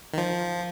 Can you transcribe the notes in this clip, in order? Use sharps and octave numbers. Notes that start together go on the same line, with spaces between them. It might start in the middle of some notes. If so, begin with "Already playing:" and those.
D#3
F3